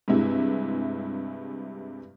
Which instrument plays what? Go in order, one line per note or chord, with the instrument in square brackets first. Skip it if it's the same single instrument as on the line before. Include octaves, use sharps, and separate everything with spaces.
[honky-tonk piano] G2 C3 G#3 E4